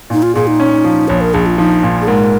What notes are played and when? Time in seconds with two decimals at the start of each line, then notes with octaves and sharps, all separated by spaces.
0.10 A#2 D#4
0.23 F4
0.35 A#2 G#4
0.47 D#4
0.60 C#4
0.84 F3
1.08 A#1 C#5
1.21 A#4
1.34 A#1 G#4
1.46 F4
1.58 F3 D#4
1.83 A#2
2.01 G#4
2.07 G#2 A#4